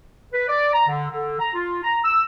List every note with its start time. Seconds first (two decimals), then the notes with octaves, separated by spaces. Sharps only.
0.32 B4
0.48 D5
0.73 A#5
0.88 D3
1.11 D3
1.40 A#5
1.54 F4
1.83 A#5
2.04 E6